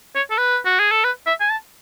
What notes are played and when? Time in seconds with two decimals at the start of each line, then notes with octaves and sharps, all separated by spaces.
0.15 C#5
0.31 A4
0.38 B4
0.65 F#4
0.79 G#4
0.91 A4
1.04 B4
1.26 E5
1.40 G#5
1.50 A5